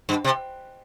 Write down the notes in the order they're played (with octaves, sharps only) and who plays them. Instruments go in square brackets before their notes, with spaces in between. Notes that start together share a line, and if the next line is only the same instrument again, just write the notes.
[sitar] G2
C3